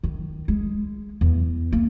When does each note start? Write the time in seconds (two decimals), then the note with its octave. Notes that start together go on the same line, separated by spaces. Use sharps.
0.03 D#3
0.48 G#3
1.21 E2
1.72 A#3